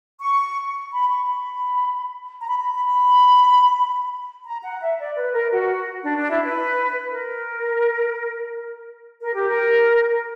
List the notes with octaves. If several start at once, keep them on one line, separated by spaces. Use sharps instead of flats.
C#6
B5
C#6
B5
A#5
B5
B5
B5
B5
A#5
F#5
E5
D5
B4
A#4
F#4
D4
D4
E4
B4
A#4
A#4
G4
A#4